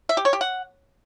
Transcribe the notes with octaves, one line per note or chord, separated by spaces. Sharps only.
E5
G4
C#5
G4
F#5